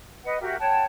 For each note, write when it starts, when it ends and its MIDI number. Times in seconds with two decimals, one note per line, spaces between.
0.23 0.39 71
0.23 0.39 75
0.23 0.39 78
0.40 0.55 66
0.40 0.55 67
0.40 0.55 70
0.40 0.55 76
0.59 0.84 73
0.59 0.84 78
0.59 0.84 79
0.59 0.84 81